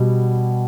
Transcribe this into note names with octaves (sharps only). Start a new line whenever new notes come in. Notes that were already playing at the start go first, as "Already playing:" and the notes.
Already playing: B2 G3